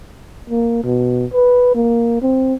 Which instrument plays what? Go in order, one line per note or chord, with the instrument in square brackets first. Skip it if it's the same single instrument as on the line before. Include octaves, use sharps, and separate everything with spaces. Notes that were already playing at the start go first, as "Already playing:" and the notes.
[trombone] A#3
B2
B4
A#3
C4